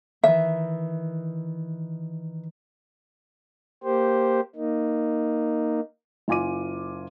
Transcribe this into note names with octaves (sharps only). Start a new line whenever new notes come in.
D#3 E3 E5
A#3 G4 C5
A#3 D#4
F#1 F4 G#5 D6 D#7